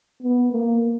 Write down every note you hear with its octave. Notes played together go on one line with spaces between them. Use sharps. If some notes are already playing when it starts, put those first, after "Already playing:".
B3
A#3